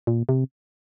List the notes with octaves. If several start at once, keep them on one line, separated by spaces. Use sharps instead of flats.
A#2
C3